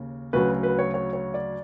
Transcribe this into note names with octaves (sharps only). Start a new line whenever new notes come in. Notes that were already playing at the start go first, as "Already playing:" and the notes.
Already playing: D#2 C#3
D2 C#3 F#3 B4
B4
C#5
C#5
C#5
D5